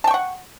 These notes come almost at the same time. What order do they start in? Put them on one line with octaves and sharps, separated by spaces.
A5 G5 C#6 F#5